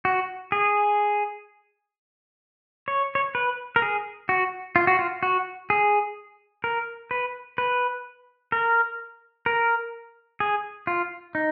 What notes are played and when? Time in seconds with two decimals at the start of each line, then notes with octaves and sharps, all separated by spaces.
0.05 F#4
0.52 G#4
2.88 C#5
3.15 C#5
3.35 B4
3.76 A#4
3.82 G#4
4.29 F#4
4.76 F4
4.87 F#4
4.99 F4
5.23 F#4
5.70 G#4
6.64 A#4
7.11 B4
7.58 B4
8.52 A#4
9.46 A#4
10.40 G#4
10.87 F4
11.35 D#4